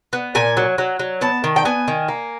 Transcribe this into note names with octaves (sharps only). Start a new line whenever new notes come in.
B3
A#2 G#5
F#3
F#3
F#3
B3 A5
D#3
G5
B3 G#5
D#3
A#3